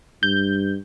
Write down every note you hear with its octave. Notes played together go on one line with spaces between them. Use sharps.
G2 G6